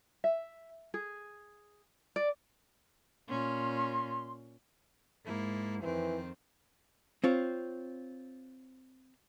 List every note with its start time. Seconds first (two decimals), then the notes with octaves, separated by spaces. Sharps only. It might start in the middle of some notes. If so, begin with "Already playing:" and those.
0.24 E5
0.94 G#4
2.16 D5
3.29 A#2 C#4 C6
5.25 G#2 A#3 E4
5.83 F2 D#3 E3 C4
7.24 C4 F4 C#5